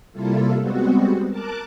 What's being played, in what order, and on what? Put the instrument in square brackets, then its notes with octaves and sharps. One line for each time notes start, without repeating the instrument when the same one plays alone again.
[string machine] C3 G3 A#3 E4 F4 A4
G3 G#3 B3 C4 F#4
A#4 A5 D6 F#6